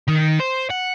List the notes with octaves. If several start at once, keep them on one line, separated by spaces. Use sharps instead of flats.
D#3
C5
F#5